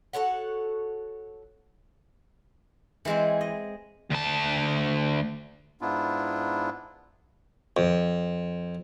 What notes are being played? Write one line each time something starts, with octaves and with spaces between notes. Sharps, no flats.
F#4 A4 C#5 F#5
E3 G#3 C4
D#5
D2 A5
G#2 B3 D4 E4 F4
F2